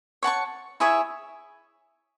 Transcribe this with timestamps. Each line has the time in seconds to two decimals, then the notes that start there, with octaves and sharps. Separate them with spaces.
0.23 C#5 F#5 A5 C#6
0.80 E4 G#4 C#5 E5